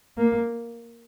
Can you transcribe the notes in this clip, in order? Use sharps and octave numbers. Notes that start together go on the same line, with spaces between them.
A#3